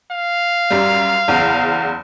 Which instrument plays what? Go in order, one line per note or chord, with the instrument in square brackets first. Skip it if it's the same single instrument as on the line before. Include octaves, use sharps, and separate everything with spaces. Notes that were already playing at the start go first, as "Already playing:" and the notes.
[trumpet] F5
[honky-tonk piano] F#2 G3
F#1 E2